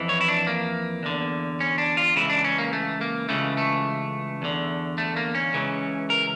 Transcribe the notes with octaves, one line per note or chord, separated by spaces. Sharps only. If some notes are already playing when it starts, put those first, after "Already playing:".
Already playing: F2 E3
C#5
E4
D4
A#3
E2 D3
C#4
D4
F4
C#2 C#3 E3 E4
D4
C#4
A#3
A3
A#3
C#2 C#3 E3 A3
A3
E2 D3
A3
A#3
C#4
C#2 C#3 E3
A#4